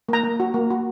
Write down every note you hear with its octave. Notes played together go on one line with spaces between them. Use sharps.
A#3 A#5
A#3
F#4
A#3
F#4